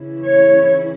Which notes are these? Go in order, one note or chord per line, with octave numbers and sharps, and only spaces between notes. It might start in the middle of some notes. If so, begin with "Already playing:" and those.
Already playing: C#3 E3 C#4 E4
C#5